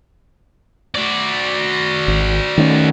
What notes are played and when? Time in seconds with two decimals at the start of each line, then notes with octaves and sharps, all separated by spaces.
0.95 F#4 D5
2.08 G#1
2.58 D#3 A3 C#4